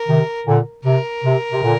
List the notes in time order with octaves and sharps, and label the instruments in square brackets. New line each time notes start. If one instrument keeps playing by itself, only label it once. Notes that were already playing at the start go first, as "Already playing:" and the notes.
Already playing: [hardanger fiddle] A#4
[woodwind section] C3 D#3
A#2 D3
[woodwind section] C3 [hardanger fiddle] A#4
[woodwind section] C3
C3
A#2 D3